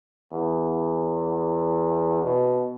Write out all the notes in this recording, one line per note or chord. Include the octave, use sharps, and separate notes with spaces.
E2
B2